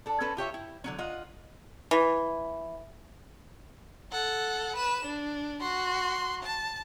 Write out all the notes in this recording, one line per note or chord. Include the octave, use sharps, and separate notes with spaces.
D4 A4
C4 C#4 A4 B4
F4 G4 C#5 E5
E4
D3 F#3 C#4
F4 D#5 F#5
E3
A4 F#5
B4 E7
D4
F#4 C6
A5